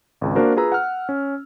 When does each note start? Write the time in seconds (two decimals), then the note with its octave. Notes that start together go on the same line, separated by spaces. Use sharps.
0.21 G#1 C#2
0.36 A#3 D4 F#4 A#4 C5
0.56 F4 G#4 B4 A#5 E6
0.72 F#5 F6
1.09 C#4